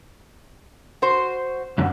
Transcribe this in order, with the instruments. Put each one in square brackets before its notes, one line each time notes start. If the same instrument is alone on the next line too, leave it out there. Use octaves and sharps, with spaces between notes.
[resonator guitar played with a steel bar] F#4 C5
[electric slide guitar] F#2 D3